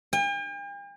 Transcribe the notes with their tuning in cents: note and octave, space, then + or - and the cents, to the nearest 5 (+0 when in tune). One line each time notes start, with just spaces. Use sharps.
G5 +45